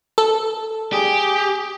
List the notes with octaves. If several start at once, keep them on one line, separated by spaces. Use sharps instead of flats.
A4
G4 G#4